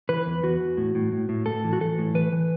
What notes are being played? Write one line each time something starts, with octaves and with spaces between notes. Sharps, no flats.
E3 B4
E2
E2 F#4
E2
A2
A2
A2
A2
A2 A4
E3
F#4
E3 A4
A2
E3 B4
E3